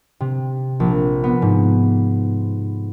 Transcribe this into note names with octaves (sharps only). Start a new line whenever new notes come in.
C3
A#1
B3
G#2